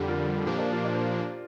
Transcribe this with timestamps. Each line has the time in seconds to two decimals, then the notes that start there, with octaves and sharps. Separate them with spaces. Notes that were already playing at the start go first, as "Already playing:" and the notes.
Already playing: F2 D3 G3 D4 G4
0.08 F4 A#4
0.46 A#2 F3 A#3 D4 G4 C5
0.58 A#4 D5
0.72 F4 A#4
0.85 D5
0.94 C5